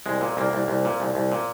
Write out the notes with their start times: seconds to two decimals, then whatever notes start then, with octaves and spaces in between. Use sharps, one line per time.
0.06 C2 G#3
0.21 A#2
0.37 C2 A#3
0.53 C2
0.68 C2
0.85 A#2
1.00 C2
1.15 C2
1.32 A#2